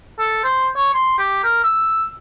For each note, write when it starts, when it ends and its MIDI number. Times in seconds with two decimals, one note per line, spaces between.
0.19 0.40 69
0.44 0.67 72
0.76 0.91 73
0.94 1.15 84
1.18 1.43 67
1.44 1.60 70
1.64 2.07 88